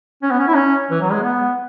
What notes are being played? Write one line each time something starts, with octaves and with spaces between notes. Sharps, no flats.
C#4
B3
C#4
E4
C#4
E3
F#3
G#3
B3